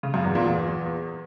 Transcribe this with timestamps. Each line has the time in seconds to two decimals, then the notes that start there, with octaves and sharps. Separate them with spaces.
0.03 C#3
0.14 F#2
0.24 E2
0.35 A#2
0.46 E2